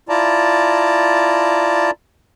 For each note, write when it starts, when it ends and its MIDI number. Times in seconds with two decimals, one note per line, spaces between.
0.09 1.91 64
0.09 1.91 65
0.09 1.91 74
0.09 1.91 81
0.09 1.91 82